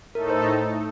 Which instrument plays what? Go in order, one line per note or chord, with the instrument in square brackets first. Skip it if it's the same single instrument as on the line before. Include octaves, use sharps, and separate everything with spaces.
[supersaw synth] A2 A3 D#4 A4 [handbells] A#4
[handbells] C5